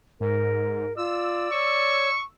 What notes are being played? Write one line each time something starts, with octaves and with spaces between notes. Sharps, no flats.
G#2 A#4
F4 D5 E6
C#5 C#6